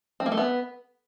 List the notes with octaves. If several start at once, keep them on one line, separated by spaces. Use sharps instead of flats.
C4
A#3
A3
B3